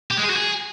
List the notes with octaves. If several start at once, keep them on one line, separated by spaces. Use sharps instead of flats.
G4
G#3
G#4
F#4
G#4